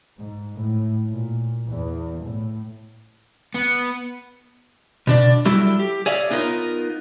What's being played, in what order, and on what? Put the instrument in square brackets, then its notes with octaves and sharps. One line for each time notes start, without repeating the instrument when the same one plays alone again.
[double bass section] G#2
A2
A#2
E2
A2
[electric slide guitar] B3
B2 D4 D5
F#3 G3 E4 A4 E5
G4
G#4 C#5 D5 E5 F5
B3 D#4 F4 A#4